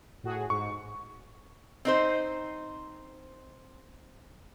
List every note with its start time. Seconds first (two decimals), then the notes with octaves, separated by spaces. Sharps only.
0.24 A2 F#4 G#4
0.50 G#2 C#6
1.85 C4 D#4 C5